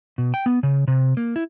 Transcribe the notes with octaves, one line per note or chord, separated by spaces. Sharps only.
B2
G5
B3
C#3
C3
A#3
E4